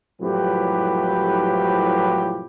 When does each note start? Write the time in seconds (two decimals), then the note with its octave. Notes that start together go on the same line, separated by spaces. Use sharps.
0.21 C2 F2 A2 F#3 G4 B4